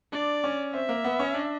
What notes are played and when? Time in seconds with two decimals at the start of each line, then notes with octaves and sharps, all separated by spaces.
0.13 D4 D5
0.44 C#4
0.73 C4 E5
0.89 A#3
1.04 B3
1.19 C#4
1.34 D4